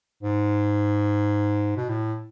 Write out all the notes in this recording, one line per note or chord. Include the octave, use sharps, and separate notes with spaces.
G#2
B2
A2